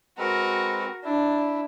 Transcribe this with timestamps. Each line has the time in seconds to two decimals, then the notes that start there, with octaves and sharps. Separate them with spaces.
0.18 G#3 C4 F#4 A#4 B4
1.04 D4 E4